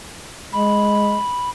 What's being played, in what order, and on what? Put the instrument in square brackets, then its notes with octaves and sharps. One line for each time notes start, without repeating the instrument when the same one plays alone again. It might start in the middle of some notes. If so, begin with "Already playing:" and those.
[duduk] G#3 [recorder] B5